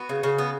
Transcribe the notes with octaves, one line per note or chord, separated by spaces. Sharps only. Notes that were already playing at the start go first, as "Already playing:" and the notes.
Already playing: B3 F#4
C#3
C#3
B3